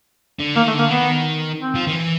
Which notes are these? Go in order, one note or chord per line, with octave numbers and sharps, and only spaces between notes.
D3
D#3 A#3
A3
D3
A#3
D#3 B3
C4
F3
D#3
E3